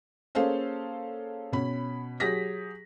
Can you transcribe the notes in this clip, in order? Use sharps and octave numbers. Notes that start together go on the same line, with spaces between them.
A#3 C#4 G#4 A4 C5 F5
B2 C#4 B5
F#3 G4 G#4 A#6 B6